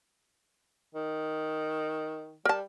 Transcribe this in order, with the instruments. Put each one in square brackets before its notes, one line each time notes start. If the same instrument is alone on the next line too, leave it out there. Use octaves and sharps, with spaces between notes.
[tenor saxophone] D#3
[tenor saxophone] G3 [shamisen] A#4 A5